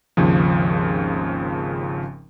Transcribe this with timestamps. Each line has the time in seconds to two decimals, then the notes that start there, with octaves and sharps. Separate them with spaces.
0.17 G#1 D#2 C#3 F3